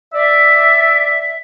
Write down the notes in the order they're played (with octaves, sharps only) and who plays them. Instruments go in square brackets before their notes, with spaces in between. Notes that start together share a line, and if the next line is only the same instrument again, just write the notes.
[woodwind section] D5 E5